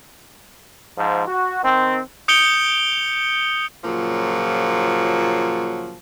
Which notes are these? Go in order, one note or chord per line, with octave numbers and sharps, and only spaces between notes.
G#2 F3
F#4
D#3 C4
D#6 G6 C#7 D7 F7 G7
A#2 C#3 F3 F#3